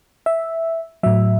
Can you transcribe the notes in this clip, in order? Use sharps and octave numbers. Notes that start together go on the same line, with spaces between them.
E5
A2 F#3 E5